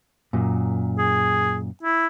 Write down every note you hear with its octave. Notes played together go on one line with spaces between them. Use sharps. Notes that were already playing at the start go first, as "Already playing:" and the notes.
F#2 A#2
G#4
E4